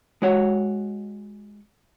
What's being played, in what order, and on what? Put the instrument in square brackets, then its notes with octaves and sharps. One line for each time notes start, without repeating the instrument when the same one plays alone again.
[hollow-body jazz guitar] G#3 F#4 C#5 F#5